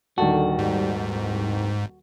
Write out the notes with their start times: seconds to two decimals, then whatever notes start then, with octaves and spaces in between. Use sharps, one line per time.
0.18 D#1 D3 D#3 F#4 A5
0.59 G#2 G3
1.11 C2